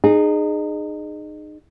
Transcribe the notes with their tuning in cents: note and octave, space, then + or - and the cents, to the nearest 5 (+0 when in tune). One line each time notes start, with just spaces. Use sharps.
D#4 -30 G#4 +0